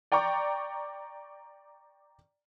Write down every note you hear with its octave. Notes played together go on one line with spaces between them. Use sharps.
D5 G5 A#5 C#6 D6